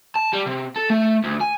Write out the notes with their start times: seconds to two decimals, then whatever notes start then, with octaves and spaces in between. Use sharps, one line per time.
0.15 A5
0.33 G3
0.46 C3
0.76 A4
0.90 A3
1.24 D2
1.41 G#5